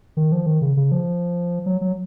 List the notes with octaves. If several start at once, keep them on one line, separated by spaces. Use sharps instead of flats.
D#3
F3
D#3
C#3
C#3
F3
F#3
F#3